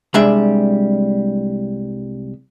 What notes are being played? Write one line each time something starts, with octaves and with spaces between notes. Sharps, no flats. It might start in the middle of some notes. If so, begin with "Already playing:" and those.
C2 G3 G#3 D4 E5